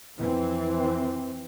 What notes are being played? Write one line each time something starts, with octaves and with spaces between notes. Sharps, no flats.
F2 E3 C4